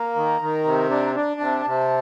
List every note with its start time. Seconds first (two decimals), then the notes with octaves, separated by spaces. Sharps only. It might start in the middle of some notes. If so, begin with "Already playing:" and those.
Already playing: A#3 A#5
0.16 D#3
0.41 D#3
0.65 C3
0.91 D4
1.16 D4
1.40 C3 A5
1.66 C3